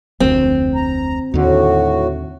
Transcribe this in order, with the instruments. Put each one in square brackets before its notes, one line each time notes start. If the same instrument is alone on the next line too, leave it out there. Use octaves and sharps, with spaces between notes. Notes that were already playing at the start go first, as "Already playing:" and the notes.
[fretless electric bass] F1 D2 [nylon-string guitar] C4
[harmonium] A#5
[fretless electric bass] D#2 D3 [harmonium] A2 F#4